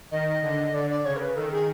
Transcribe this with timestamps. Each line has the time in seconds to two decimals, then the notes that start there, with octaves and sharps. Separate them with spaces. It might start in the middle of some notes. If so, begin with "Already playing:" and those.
0.11 D#3 D#5
0.42 D3
0.74 D3 D5
0.89 D5
1.05 C#3 C#5
1.16 A#4
1.20 B4
1.35 D#3 A4
1.51 G#4